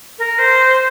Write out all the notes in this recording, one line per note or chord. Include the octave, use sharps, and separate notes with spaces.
A#4
C5